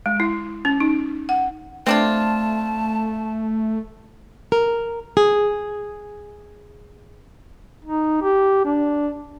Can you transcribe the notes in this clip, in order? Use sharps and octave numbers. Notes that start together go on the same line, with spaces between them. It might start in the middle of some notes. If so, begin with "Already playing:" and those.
G#3
E4
C#4
D#4
F#5
A3 C4 D4 F4 A5
A#4
G#4
D#4
G4
D4